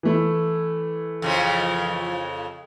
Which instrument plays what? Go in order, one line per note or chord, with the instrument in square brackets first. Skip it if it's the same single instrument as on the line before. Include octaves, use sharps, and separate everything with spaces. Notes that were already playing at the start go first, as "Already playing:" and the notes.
[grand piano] E3 A3 E4
[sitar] F2 C#3 F3